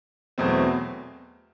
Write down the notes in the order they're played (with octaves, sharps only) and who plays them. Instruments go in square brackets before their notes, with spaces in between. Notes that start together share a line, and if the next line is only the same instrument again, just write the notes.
[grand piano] E2 B2 F#3 A3 C4